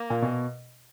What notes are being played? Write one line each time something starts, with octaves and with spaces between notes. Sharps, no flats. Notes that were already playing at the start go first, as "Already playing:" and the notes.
Already playing: A#3
A#2
B2